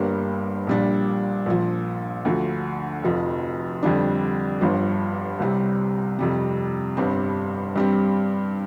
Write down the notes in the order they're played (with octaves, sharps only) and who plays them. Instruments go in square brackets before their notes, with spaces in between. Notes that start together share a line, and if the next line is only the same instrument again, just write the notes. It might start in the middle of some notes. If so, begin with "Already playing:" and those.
Already playing: [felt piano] G1 G2 G3 A#3
A#1 A#2 G3 D4
A#1 A#2 F3
D2 D3 F3
F1 F2 F3
F2 D3 G3 D4
G1 G2 F3
C2 C3 G3 C4
F2 C3 G3
G1 G2 G3 C4
G2 G3 C4